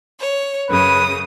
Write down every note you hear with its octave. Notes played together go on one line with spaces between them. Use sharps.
C#5
F#2 C#3 B4 D#6